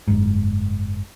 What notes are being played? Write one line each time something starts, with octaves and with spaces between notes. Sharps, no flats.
F#1 G#2